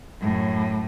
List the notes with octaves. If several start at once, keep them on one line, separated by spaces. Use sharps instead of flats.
F#2 A2